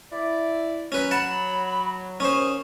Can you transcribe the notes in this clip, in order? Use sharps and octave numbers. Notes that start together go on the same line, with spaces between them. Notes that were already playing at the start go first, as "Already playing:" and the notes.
E4 D5
F#3 C#4 B4
F#5 A5 B5
D#2 C#4 C5 C#6 D#6